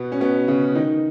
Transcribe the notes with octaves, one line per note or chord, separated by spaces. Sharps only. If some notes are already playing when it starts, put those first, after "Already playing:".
Already playing: B2 B3
C#4
B2 B3
C#3 C#4
D#3 D#4